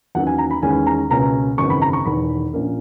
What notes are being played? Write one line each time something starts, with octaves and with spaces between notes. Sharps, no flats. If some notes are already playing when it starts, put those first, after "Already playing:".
E2 D#3 F#3 A#3 C#4 F#5
G#5
A#5
B5
E2 D#3 G#3 C#4 G#5
A#5
C#2 B2 A#3 C#4 A#5
G#1 F#2 C#3 E3 C#6
B5
A#5
C#6
E1 E2 D#3 B5
A#1 A#2 A#3 C#4